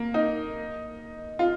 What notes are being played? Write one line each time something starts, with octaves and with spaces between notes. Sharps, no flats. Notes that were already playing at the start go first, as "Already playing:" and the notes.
Already playing: A#3
D#4
F4